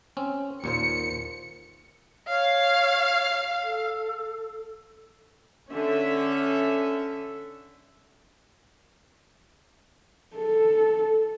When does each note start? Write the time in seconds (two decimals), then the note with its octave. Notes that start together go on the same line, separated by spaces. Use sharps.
0.17 C4 C#4
0.64 D#2 A#2 C5 C#7
2.28 C#5 F5
3.64 A4
5.71 D3 C#4 E5
10.36 A4